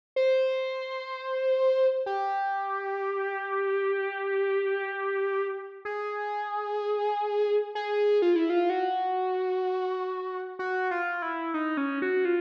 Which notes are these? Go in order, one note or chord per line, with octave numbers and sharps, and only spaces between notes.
C5
G4
G#4
G#4
F4
E4
F4
F#4
F#4
F4
E4
D#4
C#4
F#4
F4